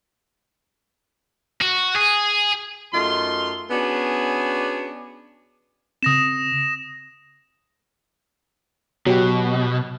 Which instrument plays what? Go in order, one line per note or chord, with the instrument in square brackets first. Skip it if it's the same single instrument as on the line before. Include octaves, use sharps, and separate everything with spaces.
[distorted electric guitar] F#4
G#4
[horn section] F#2 A3 D#4 F4 C6
B3 C#4 D4 F#4 G#4
[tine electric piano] C#3 C4 [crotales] D#6 A#6 E7
[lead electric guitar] B2 [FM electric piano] F#3 G4